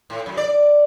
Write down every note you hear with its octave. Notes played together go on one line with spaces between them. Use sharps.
A2
F#2
D5